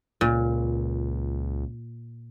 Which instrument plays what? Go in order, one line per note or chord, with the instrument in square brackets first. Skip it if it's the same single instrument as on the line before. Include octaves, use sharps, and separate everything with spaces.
[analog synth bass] C#2 [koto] A#2